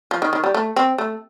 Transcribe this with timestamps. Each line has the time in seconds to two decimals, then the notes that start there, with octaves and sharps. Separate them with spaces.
0.11 F3
0.22 D#3
0.33 D#3
0.44 G3
0.55 A3
0.76 C4
0.98 A3